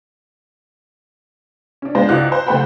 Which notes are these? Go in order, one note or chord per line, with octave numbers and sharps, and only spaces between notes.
C#4 D4
G#3 B3 D4 F4 C5
C#2 E4 F#4 D5 F#6
C5
F#1 A3 G4 C5 F#5 B5